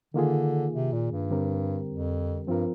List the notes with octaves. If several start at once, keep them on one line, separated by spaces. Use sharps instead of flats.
D3 D#3 A#3 F4 G#4
C3
A#2
G2
D3 G3 C4 G4 A#4
F2
G2 F3 C4 F4 A#4